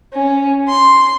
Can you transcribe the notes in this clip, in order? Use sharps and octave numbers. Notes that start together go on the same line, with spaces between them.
C#4
C6